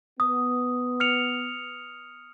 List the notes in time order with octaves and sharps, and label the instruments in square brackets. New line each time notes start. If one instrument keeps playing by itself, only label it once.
[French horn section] B3 [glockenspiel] D#6
[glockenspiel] F6 C#7 F7